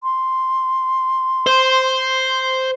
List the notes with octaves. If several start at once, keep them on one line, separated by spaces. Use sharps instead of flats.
C6
C5